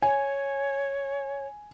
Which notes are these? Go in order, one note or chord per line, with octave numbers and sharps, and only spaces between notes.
C#5 G#5